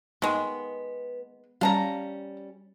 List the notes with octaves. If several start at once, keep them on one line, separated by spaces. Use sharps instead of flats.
D#3 G#3 B3
G3 C#4 F5 A5 A#5